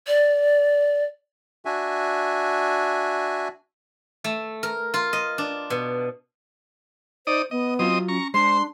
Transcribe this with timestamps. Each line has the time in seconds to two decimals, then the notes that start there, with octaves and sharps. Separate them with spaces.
0.07 D5
1.65 D4 F#4 E5 G#5
4.24 A3
4.63 A#4
4.94 F4
5.13 D#5
5.38 D4
5.70 B2
7.27 D#4 C5 D5 D#6
7.51 B3 D#5
7.79 F#3 C4 F4 D#5 D#6
8.08 C#4 A#5 C#6
8.34 G#3 D4 C5 C6